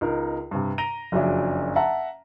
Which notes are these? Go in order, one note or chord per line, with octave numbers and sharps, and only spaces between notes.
C#2 D#4 A#4
G2 C3
A#5 A#6 D7 D#7 F7 G7
F#1 F2 C#3 F#3 D4 E5
E5 F#5 A5 A#5